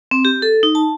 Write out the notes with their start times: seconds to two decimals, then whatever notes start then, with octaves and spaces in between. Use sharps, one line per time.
0.11 C4
0.25 G4
0.42 A4
0.63 D#4
0.75 A5